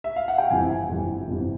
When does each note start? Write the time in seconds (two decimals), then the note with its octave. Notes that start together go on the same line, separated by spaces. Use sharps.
0.04 E5
0.16 F5
0.28 F#5
0.38 G5
0.50 G1 F2 C3 E3 G#5
0.89 G1 F2 C3 E3
1.28 G1 F2 C3 E3